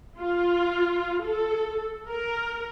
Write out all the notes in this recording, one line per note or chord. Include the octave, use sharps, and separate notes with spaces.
F4
A4
A#4